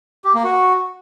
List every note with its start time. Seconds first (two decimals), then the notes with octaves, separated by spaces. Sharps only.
0.24 G4
0.34 A#3
0.44 F#4